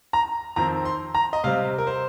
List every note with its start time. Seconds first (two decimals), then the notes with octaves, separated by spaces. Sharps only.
0.13 A#5
0.56 F2 D#3 C4 A#5
0.85 C6
1.15 A#5
1.33 D#5
1.44 C3 G3 C4 F5
1.78 A#4
1.87 C5